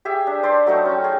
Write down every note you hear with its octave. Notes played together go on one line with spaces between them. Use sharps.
G4 G#4 E5
D4
C5 D5 A5 C6
F#3 A3 D#4 A4
C#4 G5
G#4